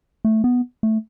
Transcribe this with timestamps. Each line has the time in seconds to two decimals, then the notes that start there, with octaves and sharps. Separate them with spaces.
0.25 A3
0.44 B3
0.83 A3